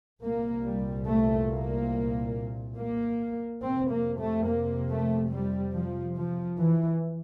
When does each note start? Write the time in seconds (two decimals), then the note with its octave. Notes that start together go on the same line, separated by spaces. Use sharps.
0.22 C2 A#2 A#3
0.64 G3
1.07 A3
1.49 A#3
2.77 A#3
3.62 F2 C3 C4
3.91 A#3
4.19 A3
4.47 A#3
4.90 A3
5.31 G3
5.74 F3
6.16 F3
6.58 E3